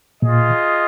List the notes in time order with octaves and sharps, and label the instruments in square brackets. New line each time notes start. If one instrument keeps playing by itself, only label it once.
[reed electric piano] A#2 [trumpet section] F4 G#4 D#5